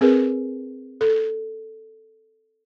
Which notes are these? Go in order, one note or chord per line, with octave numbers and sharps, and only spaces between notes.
C4 G#4 A#4 B4
A4